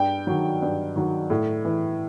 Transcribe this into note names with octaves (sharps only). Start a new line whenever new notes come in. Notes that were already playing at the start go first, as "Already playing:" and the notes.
Already playing: G2 G5
D#3 F#3
G2
D#3 F#3
A2
E3